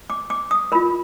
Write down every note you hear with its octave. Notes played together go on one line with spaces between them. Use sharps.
D6
D6
D#6
F4 A#4 B5